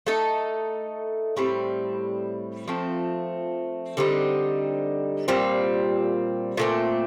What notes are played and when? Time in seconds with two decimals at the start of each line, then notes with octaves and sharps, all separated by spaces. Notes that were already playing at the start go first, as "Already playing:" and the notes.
0.07 A3 D#4 A4
1.37 A2 G3 C4
2.68 F3 A3 C4
3.97 D3 G3 C4 D#4
5.28 A#2 G3 C4
6.57 A#2 A3 C4